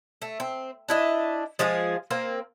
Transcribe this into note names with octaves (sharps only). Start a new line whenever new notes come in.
A3
C4
D4 E4 D#5
F3 G#3 F4 G#4
A#3 C4 F4